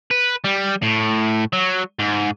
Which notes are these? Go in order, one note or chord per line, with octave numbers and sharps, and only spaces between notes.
B4
G3
A2
F#3
G#2